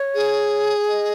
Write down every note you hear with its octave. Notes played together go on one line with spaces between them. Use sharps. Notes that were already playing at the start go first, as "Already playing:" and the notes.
Already playing: C#5
G#4
D#5